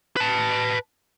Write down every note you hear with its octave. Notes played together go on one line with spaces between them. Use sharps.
B4 A5